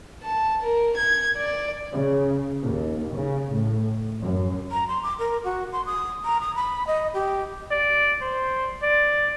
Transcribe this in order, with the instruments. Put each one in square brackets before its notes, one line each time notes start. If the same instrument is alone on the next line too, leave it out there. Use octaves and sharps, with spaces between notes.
[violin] A5
A#4
G#6
D5
[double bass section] C#3
D#2
C#3
A2
F#2
[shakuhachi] A#5
C6
D6
A#4
F#4
C6
D#6
A#5
D#6
B5
D#5
G4
[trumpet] D5
C5
D5